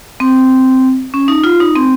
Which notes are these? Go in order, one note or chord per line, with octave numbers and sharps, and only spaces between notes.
C4
C#4
D#4
F4
D#4
C4